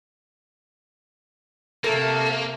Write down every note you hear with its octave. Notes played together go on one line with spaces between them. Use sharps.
C3 A3 A#3 A4 A#4